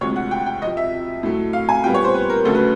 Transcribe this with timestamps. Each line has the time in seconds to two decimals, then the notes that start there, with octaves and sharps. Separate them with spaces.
0.01 D2 C3 F3 G#3 C#5
0.16 F#5
0.31 G5
0.46 G5
0.62 F2 C3 F3 D#5
0.77 E5
1.23 A2 F#3 A3
1.53 F5
1.69 G#5
1.84 A#2 G5
1.86 G3 B3
1.94 C#5
2.04 C5
2.14 B4
2.30 A#4
2.45 D2 C#3 F#3 A3 A4
2.55 B4